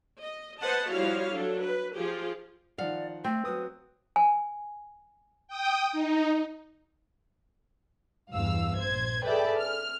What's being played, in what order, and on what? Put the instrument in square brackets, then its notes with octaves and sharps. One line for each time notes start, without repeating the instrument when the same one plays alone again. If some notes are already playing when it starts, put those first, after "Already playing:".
[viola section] D#5
B4 C5 D#5 F#5 A5
F3 G3 E4 F#4 C#5 F5
F#3 D4 A4
B4
F3 F4 G4 G#4
[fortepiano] D#3 F3 F#5 [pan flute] D5 [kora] F5
[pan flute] A3 [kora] C4
[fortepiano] F#3 D#6 [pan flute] B4
[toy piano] G#5
[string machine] G5 D#6
D#4
[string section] E2 G2 F5 E6
A#1 C5 G#6
G#4 A4 B4 D5 E5 G5
F6